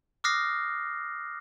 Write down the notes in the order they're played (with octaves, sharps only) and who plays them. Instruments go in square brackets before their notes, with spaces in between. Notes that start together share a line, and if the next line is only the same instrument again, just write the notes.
[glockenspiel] D6 D#6 F6 F#6 A#6 C7